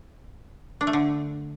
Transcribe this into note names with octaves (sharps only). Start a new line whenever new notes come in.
D4
A3
D3